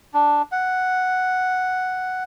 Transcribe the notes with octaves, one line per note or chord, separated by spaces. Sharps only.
D4
F#5